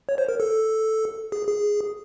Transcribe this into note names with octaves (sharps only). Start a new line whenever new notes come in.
C#5
C5
A#4
A4
G#4
G#4